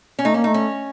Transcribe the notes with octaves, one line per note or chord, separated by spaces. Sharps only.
C#4
A3 D#4
A#3 C#4
D#4
A3
C#4